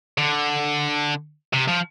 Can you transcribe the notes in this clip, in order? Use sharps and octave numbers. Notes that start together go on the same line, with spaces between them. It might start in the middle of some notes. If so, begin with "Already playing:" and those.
D3
C3
F3